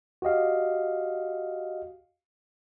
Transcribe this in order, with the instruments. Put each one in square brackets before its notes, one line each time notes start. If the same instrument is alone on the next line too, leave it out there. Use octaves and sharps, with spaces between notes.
[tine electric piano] F#4 G4 D#5 F5